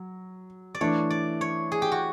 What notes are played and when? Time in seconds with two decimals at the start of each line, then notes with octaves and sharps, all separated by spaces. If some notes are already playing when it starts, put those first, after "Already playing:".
Already playing: F#3
0.75 D5
0.81 E3 A3 D4 C#5
1.10 D5
1.41 C#5
1.72 G#4
1.82 G4
1.92 F#4